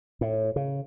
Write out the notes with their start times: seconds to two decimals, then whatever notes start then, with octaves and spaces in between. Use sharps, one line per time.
0.21 A2
0.56 C#3